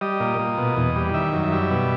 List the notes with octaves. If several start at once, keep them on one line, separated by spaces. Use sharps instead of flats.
G3 D#5
A#2
A#2
B2
E2
G3
D#3 E5
F#2
E5
G3
B2